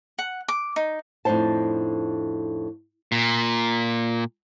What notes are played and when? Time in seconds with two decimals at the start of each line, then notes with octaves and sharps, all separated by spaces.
0.19 F#5
0.48 D6
0.76 D#4
1.25 F2 A2 D4 D#4 C5 A5
3.12 A#2